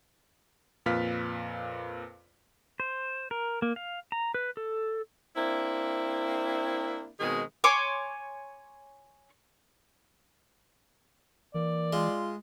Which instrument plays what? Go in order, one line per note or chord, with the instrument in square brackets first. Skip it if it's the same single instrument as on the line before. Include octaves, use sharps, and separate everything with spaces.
[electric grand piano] F2 A#2 B4 F5 F6 B6
[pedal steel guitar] C5
A#4
A#3
F5
A#5
B4
A4
[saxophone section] A#3 C4 D4 E4
B2 D#3 G#3 C4 G#4
[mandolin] C#5 G#5 C6 D6
[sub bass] E3 [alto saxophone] A#3 [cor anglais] D5
[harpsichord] G#3 [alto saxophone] F4